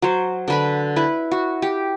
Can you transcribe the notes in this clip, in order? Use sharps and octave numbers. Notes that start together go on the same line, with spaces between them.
F#3 C5
D3 B4 B5
E4 B4
F#4
G4